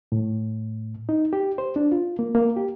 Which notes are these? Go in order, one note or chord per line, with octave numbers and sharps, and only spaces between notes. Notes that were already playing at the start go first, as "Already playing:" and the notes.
A2
D#4
G4
C5
D4
F4
A#3
A#3
G4